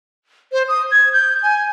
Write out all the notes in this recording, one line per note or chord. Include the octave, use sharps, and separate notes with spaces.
C5
D#6
G#6
G6
G#5